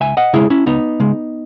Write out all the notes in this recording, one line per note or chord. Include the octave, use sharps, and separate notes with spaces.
C#2 E5 G#5
D#5 F#5
C#3 G#3 E4 G#4
C#4 E4
C#2 B3 D#4
C#3 G#3